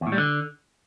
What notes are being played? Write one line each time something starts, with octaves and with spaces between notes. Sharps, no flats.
E2
A2
G3
D3